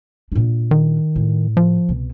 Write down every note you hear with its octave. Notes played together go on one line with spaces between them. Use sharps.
A#2 D4
D#3
A2
F3
C2 B2